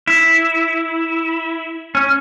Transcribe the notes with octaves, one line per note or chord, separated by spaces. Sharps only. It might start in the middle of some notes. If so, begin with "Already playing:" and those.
E4
C#4